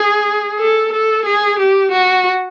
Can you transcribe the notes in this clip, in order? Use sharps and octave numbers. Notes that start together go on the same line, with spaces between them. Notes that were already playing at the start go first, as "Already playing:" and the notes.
Already playing: G#4
A4
A4
G#4
G4
F#4